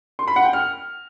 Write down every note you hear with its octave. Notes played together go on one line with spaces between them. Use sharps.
C6
B5
F#5
G5
F6